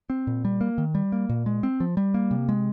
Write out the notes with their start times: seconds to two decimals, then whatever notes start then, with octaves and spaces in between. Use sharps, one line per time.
0.10 C4
0.27 A#2
0.45 G3
0.61 A#3
0.78 D#3
0.95 G3
1.12 A#3
1.29 A#2
1.46 G#3
1.63 C4
1.80 F3
1.97 G3
2.14 A#3
2.31 C3
2.49 G#3